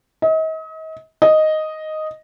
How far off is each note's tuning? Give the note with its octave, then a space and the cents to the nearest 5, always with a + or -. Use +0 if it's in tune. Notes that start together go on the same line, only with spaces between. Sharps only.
D#5 +40
D#5 +0